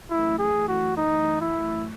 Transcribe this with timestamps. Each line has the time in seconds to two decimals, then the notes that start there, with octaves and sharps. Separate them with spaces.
0.10 F#2 E3 A3 E4
0.39 G#4
0.68 F#4
0.97 D#4
1.41 E4